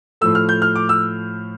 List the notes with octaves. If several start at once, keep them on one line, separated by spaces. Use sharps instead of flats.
A2 F3 A3 E6
F6
G6
F6
D6
E6